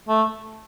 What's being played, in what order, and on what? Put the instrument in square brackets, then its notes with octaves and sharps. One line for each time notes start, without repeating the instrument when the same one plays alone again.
[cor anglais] A3